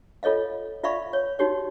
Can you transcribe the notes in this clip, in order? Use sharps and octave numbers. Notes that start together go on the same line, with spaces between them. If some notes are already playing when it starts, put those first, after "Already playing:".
F4 A4 C#5 D#5 F5
F4 D5 E5 F5 B5 C#6
C#5
D#4 F#4 G4 C#5